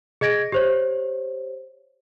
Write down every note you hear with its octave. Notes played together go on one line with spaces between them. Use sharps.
G#4 D#5 G#6 A#6 D7
G4 C5 C#5